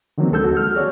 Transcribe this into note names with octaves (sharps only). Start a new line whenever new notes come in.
D3 D#3 F3 F#3 A#3 C4
D2 G#3 A4 E6 G6
F#4
F6
F#4 G#4 C#5 D5